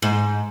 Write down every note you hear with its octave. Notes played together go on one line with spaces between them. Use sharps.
G#2